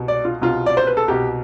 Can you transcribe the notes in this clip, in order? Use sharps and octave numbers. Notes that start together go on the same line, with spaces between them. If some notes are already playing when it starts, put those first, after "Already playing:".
Already playing: C2 B2
D5
F4
C2 B2 F4
D5
C5
B4
A4
C2 B2 G4